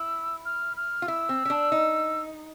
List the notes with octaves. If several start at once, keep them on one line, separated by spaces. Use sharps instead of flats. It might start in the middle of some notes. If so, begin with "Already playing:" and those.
Already playing: E4 E6
F6
F6
F4
E4 E6
C4
C#4
D4
D#4